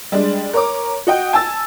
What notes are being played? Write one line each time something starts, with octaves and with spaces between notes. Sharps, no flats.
G3 G#3 D4
A#4 C#5 A#5 D6
F#4 D#5 G5
G#5 A5 E6 A6